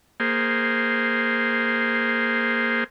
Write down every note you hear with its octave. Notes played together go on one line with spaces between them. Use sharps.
A#3 G#4 C5